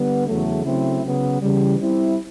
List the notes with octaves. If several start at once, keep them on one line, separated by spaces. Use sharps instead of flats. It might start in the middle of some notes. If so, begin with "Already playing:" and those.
Already playing: D3 G3 B3
E2 C#3 F#3 A3
C#3 F#3 A3 C4 E4
C#3 F#3 B3
C#3 E3 G3
G3 C4 E4